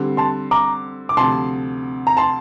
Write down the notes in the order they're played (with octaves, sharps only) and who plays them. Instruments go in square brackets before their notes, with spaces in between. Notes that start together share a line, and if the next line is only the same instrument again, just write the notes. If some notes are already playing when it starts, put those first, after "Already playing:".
Already playing: [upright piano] D3 G3 C4
[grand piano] A5 C6
A#5 D6
D6
[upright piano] D2 C3 F3 [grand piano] A5 C6
[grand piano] A#5
A5 C6